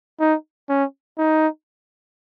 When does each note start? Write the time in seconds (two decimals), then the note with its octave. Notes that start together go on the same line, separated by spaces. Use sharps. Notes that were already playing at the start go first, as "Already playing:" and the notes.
0.20 D#4
0.69 C#4
1.18 D#4